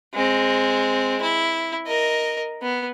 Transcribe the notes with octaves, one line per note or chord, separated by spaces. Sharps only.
G#3 C4
E4
A#4 D#5
B3